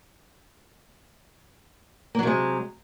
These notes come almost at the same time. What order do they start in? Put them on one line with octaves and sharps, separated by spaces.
A#3 F#3 C3 G#3